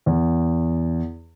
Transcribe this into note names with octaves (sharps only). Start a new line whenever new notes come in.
E2